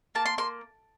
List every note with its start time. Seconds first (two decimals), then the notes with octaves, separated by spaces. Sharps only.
0.15 A#3 A5
0.26 C6
0.38 A#3 C6